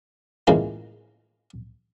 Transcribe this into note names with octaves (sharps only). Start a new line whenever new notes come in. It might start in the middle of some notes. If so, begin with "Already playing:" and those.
A2 C#3 E3 G#3 A#3 F4